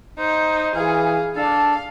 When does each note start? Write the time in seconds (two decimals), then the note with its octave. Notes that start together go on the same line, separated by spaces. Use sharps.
0.18 D#4 C5
0.75 E3 G#4 F5
1.36 D4 A4 F5